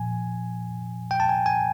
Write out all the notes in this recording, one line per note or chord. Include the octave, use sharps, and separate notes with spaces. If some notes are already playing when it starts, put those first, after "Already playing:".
Already playing: A#2 F3 G#5
G5
A5
G#5
G#5